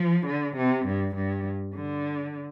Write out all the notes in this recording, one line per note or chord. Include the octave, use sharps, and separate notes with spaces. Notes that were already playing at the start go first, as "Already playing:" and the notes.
Already playing: F3
D3
C3
G2
G2
D3